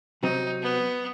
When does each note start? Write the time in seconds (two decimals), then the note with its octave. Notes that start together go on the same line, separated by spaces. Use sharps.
0.23 C3 F#3 C4 D#4
0.62 B3